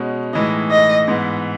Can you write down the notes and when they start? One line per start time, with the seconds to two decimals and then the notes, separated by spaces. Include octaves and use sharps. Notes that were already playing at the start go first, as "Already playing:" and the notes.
Already playing: B2 G#3 C#4 F#4
0.33 A2 E3 G#3 D#4 D#5
0.71 D#5
1.08 G#2 E3 B3